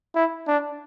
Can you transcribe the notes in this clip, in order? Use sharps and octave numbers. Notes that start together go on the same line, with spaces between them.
E4
D4